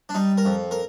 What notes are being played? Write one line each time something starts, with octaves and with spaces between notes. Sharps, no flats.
D4
G3 D#4
A#4
F2
A#4